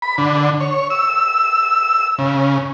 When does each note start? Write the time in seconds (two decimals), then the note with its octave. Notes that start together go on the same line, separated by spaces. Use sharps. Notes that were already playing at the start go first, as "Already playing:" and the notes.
0.02 B5
0.18 D3
0.60 C#5
0.90 E6
2.19 C#3